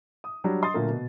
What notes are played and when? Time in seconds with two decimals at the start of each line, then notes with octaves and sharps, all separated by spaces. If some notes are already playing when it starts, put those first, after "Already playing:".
0.24 D#6
0.44 F#3 G3 D4
0.62 D#5 C6 D#6 A6
0.74 A#2 D3 F#3 A3 A#3
0.90 B2